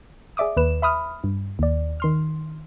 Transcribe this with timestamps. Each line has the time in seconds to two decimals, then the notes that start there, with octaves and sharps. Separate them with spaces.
0.37 G#4 D5 E5 D6 D#6
0.56 D#2 B4 E7
0.82 E5 B5 D#6 F6
1.24 G2
1.59 D#2 D5
2.00 D#3 C6 F6